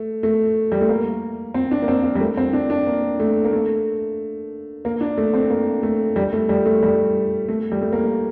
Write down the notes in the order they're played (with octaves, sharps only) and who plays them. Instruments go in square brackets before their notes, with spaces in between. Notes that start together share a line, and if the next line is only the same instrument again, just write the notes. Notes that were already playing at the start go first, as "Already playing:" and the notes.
Already playing: [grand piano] A3
A3
G3
A3
A#3
C4
D4
A#3
C4
A#3
G3
A3
C4
D4
D4
A#3
A3
A#3
A3
A#3
D4
A3
C4
A#3
A3
G3
A3
G3
A3
G3
A3
G3
A3
A#3